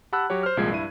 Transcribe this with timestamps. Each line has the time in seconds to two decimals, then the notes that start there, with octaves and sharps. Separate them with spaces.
0.12 G4 F#5 A5 B5 E6 F#6
0.30 F#3 F#4 G4 C#5
0.43 C5 F6
0.57 C2 A#2 F3 G#3 G#6 C7
0.71 G2 E4 D#7